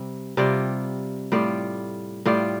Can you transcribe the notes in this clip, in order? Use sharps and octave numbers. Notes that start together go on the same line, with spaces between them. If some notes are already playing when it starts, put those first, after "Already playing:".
Already playing: C3 G3
C3 G3 F4 D5
A2 G3 F4 D5
A2 G3 F4 D5